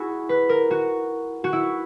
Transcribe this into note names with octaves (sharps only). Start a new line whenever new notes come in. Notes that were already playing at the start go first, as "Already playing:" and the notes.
Already playing: E4 F#4 G#4
B4
A#4
F#4
F#4
E4